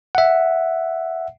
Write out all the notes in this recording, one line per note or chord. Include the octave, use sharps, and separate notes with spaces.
E5 F#5